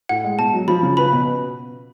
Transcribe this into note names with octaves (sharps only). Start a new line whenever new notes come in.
A2 F#5
G#3
B2 A5
F#3
F3 B5
C#3
B4 B5
B2